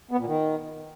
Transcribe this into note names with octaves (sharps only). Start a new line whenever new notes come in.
B3
A#2
D#3